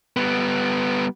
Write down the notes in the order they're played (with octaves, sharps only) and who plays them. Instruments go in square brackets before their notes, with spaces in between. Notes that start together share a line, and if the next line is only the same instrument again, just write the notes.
[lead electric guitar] G3 B3